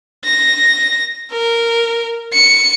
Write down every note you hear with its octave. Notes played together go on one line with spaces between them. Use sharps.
A#6
A#4
C#7